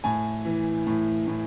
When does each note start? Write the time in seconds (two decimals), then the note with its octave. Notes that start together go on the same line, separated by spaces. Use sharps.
0.04 A2 G#5
0.45 E3
0.87 A2
1.27 A2